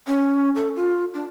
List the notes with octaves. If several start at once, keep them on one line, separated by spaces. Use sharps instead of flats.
C#4
A4
F4
D4